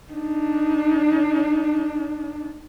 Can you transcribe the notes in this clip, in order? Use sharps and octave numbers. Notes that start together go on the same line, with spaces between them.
D4 D#4